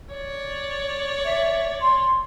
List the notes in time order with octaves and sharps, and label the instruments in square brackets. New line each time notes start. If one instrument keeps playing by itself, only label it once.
[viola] C#5 D5
[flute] E5
C6